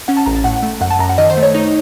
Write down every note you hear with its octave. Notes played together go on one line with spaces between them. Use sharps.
C#4 F#5
A5
A1 A#5
A5
A2 F#5
A3
F#2 F#5
A5
F#2 A#5
F#5
D#3 D#5
C5
A3
C#5
D#4